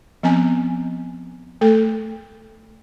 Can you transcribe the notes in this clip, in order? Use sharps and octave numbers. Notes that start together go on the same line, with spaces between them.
F3 B3 C4 G#5
A3 A4